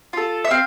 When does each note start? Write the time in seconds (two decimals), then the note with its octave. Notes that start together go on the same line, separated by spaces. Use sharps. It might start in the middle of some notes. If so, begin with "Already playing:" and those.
0.13 F4 A4
0.45 E5
0.51 C4 F5